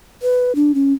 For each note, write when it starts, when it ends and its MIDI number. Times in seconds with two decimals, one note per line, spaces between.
0.22 0.52 71
0.55 0.72 62
0.75 0.93 61